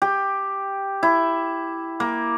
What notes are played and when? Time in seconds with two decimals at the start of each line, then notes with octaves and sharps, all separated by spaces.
0.02 G4
1.03 E4
2.00 A#3